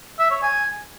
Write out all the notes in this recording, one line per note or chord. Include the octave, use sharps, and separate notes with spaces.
E5
C#5
G#5